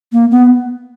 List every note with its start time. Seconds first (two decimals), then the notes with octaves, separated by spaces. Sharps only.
0.12 A#3
0.31 B3